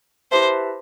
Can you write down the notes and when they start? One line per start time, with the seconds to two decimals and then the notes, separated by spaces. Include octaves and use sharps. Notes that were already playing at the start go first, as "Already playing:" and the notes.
0.31 E4 G4 B4 C5 E5 A5